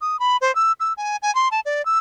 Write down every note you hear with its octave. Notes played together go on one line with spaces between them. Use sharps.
D#6
B5
C5
E6
E6
G#5
G#5
C6
A5
D5
E6